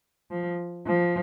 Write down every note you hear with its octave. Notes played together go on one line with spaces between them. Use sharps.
F3
F3